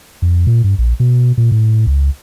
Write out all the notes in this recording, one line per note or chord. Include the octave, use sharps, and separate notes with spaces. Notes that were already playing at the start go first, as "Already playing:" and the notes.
F2
A#2
G2
A#1
B2
A#2
A2
C#2